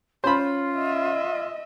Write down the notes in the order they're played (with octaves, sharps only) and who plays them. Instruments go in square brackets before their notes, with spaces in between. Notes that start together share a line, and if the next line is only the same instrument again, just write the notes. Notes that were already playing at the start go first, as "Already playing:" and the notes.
[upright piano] C#4 [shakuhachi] F4 [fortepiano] C5 B5
[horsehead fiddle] D#5 E5